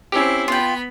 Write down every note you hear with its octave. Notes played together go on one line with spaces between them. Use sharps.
C4 C#4 E4 G4
B3 F4 G5 B5